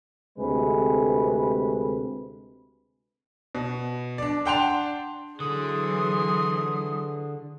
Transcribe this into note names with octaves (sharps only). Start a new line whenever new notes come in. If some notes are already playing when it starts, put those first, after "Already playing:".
D2 C3 G#3 A3 B4
B2
D4 D5
D4 F#5 G5 A5 C6 F7
D3 E3 F#3 G#4 C6 D#6